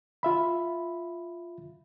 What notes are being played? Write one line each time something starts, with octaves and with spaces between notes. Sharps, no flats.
F4 E5 B5